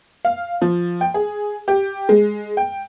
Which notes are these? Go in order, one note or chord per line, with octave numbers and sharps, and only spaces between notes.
F5
F3
G5
G#4
G4
G#3
G5